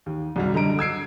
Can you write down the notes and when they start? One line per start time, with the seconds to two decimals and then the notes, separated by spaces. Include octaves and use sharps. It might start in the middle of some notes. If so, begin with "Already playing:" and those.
0.06 D#2
0.36 C2 F#2 G3
0.54 D3 G3 D#5 A#5 D7
0.79 E6 G#6 C7 D7